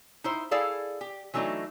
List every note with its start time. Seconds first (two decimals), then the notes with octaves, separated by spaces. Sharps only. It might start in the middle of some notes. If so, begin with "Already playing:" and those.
0.24 D#4 E4 C5
0.51 E4 G#4 A4 D5 F5
1.01 G4
1.34 E3 F#3 A3 D4 D#4